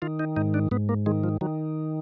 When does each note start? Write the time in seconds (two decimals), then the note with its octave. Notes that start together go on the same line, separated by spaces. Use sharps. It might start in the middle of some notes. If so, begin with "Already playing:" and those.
0.02 D#3 F4
0.19 D#4
0.36 G#2 D#4
0.54 D4
0.71 G#2 B3
0.89 A#3
1.06 D#3 G#3
1.24 F3
1.41 D#3 F#3